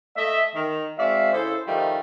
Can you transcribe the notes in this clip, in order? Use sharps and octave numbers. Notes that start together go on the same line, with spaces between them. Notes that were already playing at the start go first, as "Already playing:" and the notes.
A3 D#5 E5
D#3
G#3 C4 F#4 D5 E5 F5
C#3 E4 G#4 A4 C5
D#3 F3 G3 A3 D#4 F4